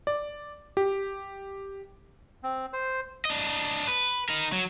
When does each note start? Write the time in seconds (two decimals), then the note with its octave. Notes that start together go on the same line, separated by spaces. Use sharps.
0.07 D5
0.77 G4
2.43 C4
2.73 C5
3.25 D4 D#5
3.88 B4
4.29 D#4 A#4
4.52 F#3